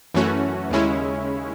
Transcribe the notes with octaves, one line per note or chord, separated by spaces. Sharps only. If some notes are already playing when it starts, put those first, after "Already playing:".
F#2 E3 A3 C#4 F#4
D#2 C#3 G#3 C#4 E4